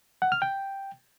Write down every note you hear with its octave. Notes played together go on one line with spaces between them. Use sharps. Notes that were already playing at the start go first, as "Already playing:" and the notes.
F#5
F6
G5